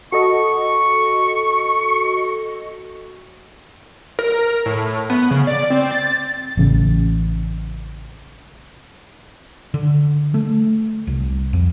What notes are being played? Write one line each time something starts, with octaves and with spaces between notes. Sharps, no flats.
F#4 A4 D#5 C#6
A#4
A2
B3
C#3
D5
C4
A6
A1 C#3
D3
A3
C2
F2